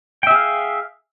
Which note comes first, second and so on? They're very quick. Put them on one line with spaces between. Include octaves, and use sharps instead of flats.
G5 E5 G#4 F5